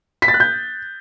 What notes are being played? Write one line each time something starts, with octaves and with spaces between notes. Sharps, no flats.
B6
A6
F#6
G6